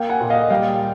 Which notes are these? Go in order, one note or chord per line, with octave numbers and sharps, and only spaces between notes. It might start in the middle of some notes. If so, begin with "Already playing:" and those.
Already playing: A#3 F5 G5
F#5 G#5
A#2
D#5 F5
G3 F5 G5